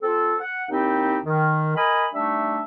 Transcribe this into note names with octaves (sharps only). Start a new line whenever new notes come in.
C4 F4 A4
F#5
D#2 C4 D#4 E4 G4
D#3
A#4 D#5 G#5 B5
G3 A3 D4 D#4 E5